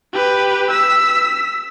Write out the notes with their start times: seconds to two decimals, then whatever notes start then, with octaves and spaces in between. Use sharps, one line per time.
0.13 G4 B4
0.71 E6 B6